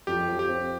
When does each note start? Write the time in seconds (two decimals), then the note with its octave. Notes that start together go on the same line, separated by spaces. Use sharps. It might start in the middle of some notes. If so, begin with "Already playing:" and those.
0.07 F2 G4
0.28 F3
0.39 G4
0.49 C4